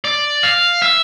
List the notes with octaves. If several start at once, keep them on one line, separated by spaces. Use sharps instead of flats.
D5
F5
E5